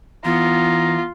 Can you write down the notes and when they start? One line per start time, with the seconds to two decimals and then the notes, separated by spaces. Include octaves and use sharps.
0.25 E3 B3 F4 A#5